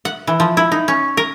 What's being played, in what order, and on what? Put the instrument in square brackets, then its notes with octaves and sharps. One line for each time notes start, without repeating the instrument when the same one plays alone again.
[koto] F#5
E3
F3
E4
D#4
C#4
A#4